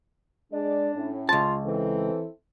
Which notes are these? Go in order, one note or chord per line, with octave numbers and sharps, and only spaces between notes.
G#3 D4 D5
A2 C#4
C#2 F4 A5
E3 C4 E4 A4